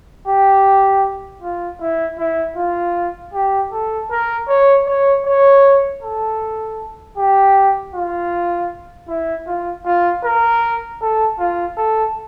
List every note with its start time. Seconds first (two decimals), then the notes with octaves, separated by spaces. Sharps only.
0.28 G4
1.42 F4
1.81 E4
2.18 E4
2.56 F4
3.34 G4
3.72 A4
4.11 A#4
4.48 C#5
4.87 C#5
5.26 C#5
6.02 A4
7.18 G4
7.95 F4
9.09 E4
9.47 F4
9.85 F4
10.24 A#4
11.01 A4
11.39 F4
11.77 A4